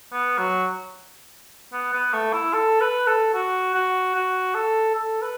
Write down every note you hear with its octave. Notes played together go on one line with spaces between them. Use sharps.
B3
F#3
B3
B3
A3
E4
A4
B4
A4
F#4
F#4
F#4
A4
A4
B4